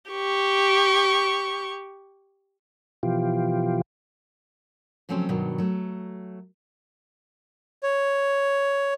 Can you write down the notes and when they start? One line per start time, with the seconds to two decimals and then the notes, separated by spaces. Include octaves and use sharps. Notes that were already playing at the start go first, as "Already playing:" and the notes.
0.11 G4 C#6
3.03 B2 E3 F3 F4 G4
5.09 C#3 F3 F#3 A3 C4 C#4
5.29 G2 B2 D#3 F#3
5.58 F#3 A3
7.83 C#5